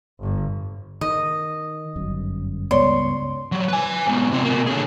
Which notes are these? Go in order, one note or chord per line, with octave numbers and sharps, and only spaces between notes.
G1
D#3 D#5
G1 F#2
C#2 G2 B3 C#5 D5 C6
F#3 G3
B4 G#5
G#2 B2
C3 F4
B2 A#3
D3 G#4